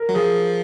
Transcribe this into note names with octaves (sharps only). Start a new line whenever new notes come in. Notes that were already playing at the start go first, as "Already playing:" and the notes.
Already playing: A#4
F#3
F3 G#4